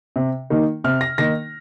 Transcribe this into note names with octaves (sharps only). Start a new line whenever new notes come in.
C3
D#3 A#3 D#4
C3 F6
A#6
D#3 A#3 D#4 A#6